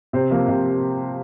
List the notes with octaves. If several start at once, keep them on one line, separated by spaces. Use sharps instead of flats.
C3 C5
F3 A#3
C3